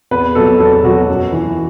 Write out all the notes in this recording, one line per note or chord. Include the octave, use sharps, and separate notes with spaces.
E2 B4
B2 F#3 A4
E2 A4
B2 F#3 F#4
F#2
E3